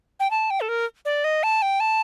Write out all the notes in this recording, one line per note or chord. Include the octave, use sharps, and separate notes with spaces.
G5
A5
G5
A4
A#4
D5
D#5
A5
G5
A5